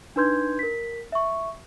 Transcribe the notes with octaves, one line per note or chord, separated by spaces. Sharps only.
D4 D#4 B4 C6 G6 G#6
A#4 B6
E5 C#6